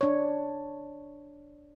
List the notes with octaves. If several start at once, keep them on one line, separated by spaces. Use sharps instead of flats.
D4 C#5